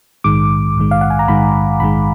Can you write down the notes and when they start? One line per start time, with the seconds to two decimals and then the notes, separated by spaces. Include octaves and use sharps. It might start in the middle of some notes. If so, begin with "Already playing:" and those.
0.24 A#1 G#2 D#3 G#3 D6
0.77 A#1 G#2 D#3 G#3
0.91 F5
1.01 F#5
1.10 G#5
1.19 A#5
1.28 A#1 G#2 D#3 G#3 B5
1.80 A#1 G#2 D#3 G#3 B5